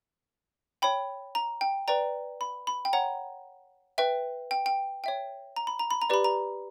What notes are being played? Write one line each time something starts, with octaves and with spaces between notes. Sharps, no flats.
C#5 G5 B5
A#5
G5
B4 D5 G5 A#5
B5
B5
G5
C#5 F#5 A#5
B4 E5 G5
G5
G5
C#5 E5 G5
A#5
B5
A#5
B5
A#5
G4 B4 D5 B5
A#5